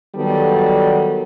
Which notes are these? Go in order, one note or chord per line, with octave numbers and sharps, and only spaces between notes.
D#3 F#3 G3 B3 A4 D5